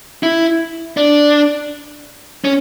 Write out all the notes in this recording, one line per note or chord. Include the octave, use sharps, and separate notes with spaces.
E4
D4
C#4